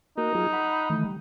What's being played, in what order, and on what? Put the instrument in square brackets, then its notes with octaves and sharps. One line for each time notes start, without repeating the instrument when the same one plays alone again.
[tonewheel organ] A#3 F#4 A#4 [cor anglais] D#4
[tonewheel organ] F#3 F4 G#4
F#5 B5
D#3 E3 A3
G3